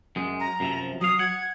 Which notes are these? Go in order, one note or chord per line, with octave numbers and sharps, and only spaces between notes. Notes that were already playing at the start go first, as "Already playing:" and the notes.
F#2 G#3
A#5
F#2 C3 F3
F#3 F5 D#6
F#5 G#6